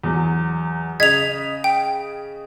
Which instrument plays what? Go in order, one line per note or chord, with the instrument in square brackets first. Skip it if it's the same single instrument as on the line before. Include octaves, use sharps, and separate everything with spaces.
[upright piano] E2 F#3
[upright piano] C#3 D#5 B6 [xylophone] G#6 F7
[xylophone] G5